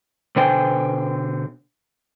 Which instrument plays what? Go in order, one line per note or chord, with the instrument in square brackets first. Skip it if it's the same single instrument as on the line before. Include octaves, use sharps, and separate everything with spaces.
[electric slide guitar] B2 D3 C5 G5 G#5